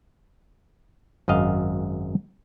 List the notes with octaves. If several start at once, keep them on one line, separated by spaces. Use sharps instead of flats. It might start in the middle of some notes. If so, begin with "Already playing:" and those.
G#1 F#2 D#5 F5